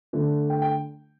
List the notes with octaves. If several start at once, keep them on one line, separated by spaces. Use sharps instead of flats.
D3 A3
G5
G5